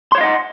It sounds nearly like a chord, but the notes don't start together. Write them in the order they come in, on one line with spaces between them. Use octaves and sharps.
C6 C#5 F5 D#5 F#5